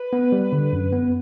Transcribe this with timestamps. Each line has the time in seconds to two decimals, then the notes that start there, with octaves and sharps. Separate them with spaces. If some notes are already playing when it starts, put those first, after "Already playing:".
Already playing: B4
0.13 B3
0.32 G3
0.52 D3
0.73 F#2
0.93 B3